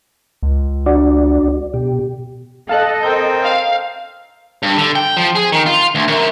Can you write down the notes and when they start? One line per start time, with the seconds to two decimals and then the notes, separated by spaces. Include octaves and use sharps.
0.43 C#2
0.86 D4 F#4 D5
1.74 B2 G4
2.69 A4 D#5 F5 A5 F#6
3.03 C4 A#4 G6
3.43 F5
4.63 G2
4.77 D3
4.95 G5
5.17 F3
5.35 G#4
5.52 D#3
5.66 F4
5.95 D2
6.08 F#2